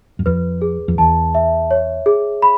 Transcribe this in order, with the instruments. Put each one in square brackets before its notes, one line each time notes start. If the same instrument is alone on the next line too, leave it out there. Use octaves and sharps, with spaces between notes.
[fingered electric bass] F#2
[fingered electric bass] F2 [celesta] B4
[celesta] G#4
[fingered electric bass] F2
[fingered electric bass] E2 [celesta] A5
[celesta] E5
C#5
G#4
B5